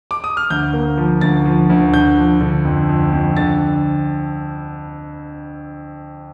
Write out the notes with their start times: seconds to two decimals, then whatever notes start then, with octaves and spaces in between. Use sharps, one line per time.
0.11 D6
0.24 D#6
0.37 F6
0.50 D2 G6
0.73 A#3
0.98 F3
1.21 D2 A6
1.45 F3
1.70 D2
1.93 D3 G6
2.17 F3
2.41 D3
2.65 F2
2.89 F2
3.13 F2
3.37 D3 A6